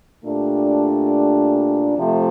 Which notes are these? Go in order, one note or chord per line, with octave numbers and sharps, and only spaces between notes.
A#2 A3 D4 G4
C3 F3 A3